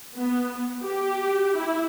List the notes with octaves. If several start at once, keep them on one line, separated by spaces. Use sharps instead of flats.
B3
G4
E4